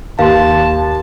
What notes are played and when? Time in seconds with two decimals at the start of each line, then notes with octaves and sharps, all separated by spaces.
0.19 D#2 F5 A5 C6